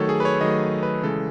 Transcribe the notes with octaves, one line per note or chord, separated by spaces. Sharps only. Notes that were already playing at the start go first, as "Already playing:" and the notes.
Already playing: D#3 F#3 A3 A4 C#5
G#4
B4
C#5
D#3 F#3 A3 D#5
B4
C#3 E3 G#3 A4